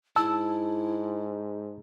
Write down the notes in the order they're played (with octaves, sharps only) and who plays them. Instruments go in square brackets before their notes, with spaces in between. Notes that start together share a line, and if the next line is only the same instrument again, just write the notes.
[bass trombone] G#2 [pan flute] E4 [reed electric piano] A5 E6